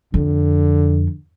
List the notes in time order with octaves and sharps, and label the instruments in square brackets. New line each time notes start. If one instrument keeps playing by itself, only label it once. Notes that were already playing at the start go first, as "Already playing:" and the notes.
[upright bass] F2 [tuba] D3